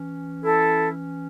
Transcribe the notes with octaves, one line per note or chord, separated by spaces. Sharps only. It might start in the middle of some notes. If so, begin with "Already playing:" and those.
Already playing: E3 C#4
E4 A4